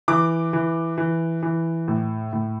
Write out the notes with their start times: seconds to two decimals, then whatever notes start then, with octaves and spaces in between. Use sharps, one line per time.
0.08 E3 D6
0.53 E3
0.98 E3
1.43 E3
1.88 A2
2.33 A2